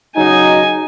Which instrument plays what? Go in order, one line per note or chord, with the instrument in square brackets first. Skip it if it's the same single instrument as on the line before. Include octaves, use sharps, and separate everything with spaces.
[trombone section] C#3 F#3 D#4 [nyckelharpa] G#5